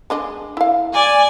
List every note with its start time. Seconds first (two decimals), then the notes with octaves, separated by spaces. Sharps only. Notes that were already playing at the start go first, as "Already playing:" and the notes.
0.10 G#3 D4 D#5
0.57 E4 F5
0.93 D5 G#5